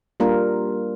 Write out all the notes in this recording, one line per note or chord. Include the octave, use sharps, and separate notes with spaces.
G3 A#3 D4 F4 A#4